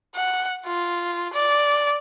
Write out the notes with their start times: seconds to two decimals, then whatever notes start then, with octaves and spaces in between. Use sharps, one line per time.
0.15 F#5
0.66 F4
1.33 D5